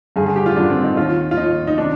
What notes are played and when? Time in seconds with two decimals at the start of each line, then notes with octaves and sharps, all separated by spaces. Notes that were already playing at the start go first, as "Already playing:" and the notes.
0.16 G2 G#4
0.20 D3
0.26 G#4
0.36 G4
0.46 F4
0.56 G2 D3 D4
0.70 C4
0.84 D#4
0.97 D#2 D#3 F4
1.31 F4
1.37 D#2 D#3 D#4
1.67 D#4
1.78 C3 D#3 D4